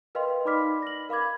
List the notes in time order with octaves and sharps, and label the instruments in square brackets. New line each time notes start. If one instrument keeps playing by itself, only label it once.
[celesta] A#4 B4 D#5 F5 G5 C6
D#4 D5 B5 D6 F6 B6
A#6 F#7
A#4 F5 B5 D6 G#6